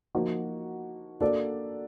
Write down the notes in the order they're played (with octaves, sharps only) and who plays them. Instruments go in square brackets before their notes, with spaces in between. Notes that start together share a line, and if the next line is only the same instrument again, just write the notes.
[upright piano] F3 A#3 D#4 F#4
A#3 D4 F#4 A4 D5